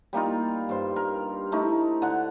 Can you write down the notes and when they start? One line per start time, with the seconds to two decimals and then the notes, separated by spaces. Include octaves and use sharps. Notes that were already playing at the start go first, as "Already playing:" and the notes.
0.13 G3 A#3 D#4 F4
0.69 G2 C5
0.96 A#4
1.52 A3 D#4 E4
2.02 D3 F#5